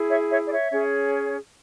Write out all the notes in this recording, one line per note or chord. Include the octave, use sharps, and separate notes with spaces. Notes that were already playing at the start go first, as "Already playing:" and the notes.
Already playing: E4 G#4
C#5 E5
C#5 E5
D5
C#5 E5
C#4 G#4 C#5